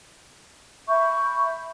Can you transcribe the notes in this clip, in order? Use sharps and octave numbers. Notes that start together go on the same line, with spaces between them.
E5 B5 C#6 G6